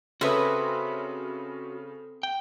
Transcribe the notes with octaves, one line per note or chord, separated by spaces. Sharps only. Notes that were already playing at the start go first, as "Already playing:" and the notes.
C#3 C4 C#4 F#4 A4 B4 E5 D#6
G5